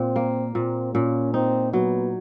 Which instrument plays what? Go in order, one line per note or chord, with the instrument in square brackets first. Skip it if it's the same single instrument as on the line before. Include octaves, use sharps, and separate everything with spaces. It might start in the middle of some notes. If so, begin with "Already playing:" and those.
Already playing: [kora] A#2 [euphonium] C4
[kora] A#3
[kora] A#2 [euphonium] C4
[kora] A#2 [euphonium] C#4
[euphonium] C4 [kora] D#4
[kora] F#3 [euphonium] B3